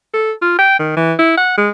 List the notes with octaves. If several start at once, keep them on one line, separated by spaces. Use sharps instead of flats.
A4
F4
G5
D#3
E3
E4
F#5
G#3